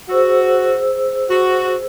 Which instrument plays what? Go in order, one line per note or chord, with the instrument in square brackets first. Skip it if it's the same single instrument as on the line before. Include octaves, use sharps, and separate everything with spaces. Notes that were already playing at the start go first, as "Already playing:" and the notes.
[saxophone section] F#4 [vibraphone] G#4 C5 E6
[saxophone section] F#4